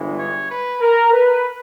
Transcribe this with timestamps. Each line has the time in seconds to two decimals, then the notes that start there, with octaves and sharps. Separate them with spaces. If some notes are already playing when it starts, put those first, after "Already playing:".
Already playing: G1 G2 E3 G#3
0.18 C#5
0.49 B4
0.81 A#4
1.12 B4